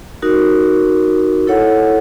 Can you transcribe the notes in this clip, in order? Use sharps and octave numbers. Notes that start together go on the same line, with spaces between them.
D#4 F#4 A#4
E4 A4 C#5 F#5